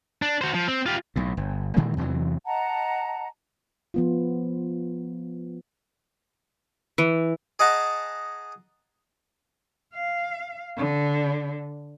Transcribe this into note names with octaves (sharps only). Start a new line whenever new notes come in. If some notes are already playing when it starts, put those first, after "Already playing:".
D4
F#4 C5
F3
C4
F4 G4
B1 A2
G1
A#2 D#3 E3 G#3
E2 C3 E3 F#3
D#5 F#5 A5 A#5
F3 B3 F4
E3
G#4 D#5 F#5 A5 A#5
F5
D3